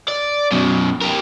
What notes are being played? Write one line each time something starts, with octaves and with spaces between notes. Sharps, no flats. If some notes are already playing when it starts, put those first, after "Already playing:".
D5
F#2 B2
G4 A#4